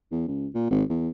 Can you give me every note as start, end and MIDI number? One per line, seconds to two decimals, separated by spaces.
0.12 0.26 40
0.28 0.47 37
0.55 0.66 46
0.70 0.83 32
0.90 1.09 40